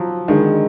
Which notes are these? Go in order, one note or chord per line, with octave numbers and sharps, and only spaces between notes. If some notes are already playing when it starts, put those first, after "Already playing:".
Already playing: F3 F#3
D3 D#3 G#3 D4